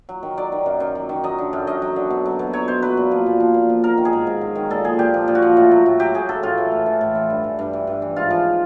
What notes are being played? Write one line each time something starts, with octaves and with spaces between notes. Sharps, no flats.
F#3
D#3
F#3 D5
D#3
F#2
F#2
F#3
D#3
F#3 D#5
D3
F#2
F#2 D#5
F#3
D3
B2
F#3
B2
F#3 C#5
B2 C5
F#3 B4
A#2
F3
A#2
F3
A#2
F3
F#3 A#4
D#3
G#4
G#2
G#2
F#3
D#3
A#2 A4
F3 G#4
A#2 G4
F3
A#2
F#4
F3
A2
F#3
A2
F#3 G4
A2 G#4
F#3 A4
A2 F4
E3
A2
E3
A2
E3
G2
E3
G2
E3
G2
E3
G#2 F4
F3